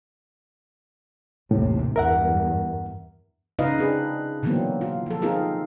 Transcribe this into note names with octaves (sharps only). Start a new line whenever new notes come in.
A1 D#2 A2 C3
E2 G2 A#4 E5 F#5
C#3 D#4 F4 B4 D#5 F5
C4 D4 G#4 B4
B2 D3 E3 F#3 A#3 C4
F4
F3 A4
C4 D#4 F4 G#4 A#4